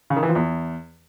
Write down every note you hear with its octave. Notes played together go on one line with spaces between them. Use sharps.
C#3
D#3
E3
F3
E2